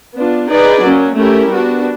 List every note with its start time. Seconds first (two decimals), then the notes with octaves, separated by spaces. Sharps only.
0.16 B3 D4 F4
0.49 D#4 G#4 B4 D5
0.83 F#3 A#3 C#4
1.16 A3 C#4 E4 G4 A#4
1.51 G3 B3 D4 F#4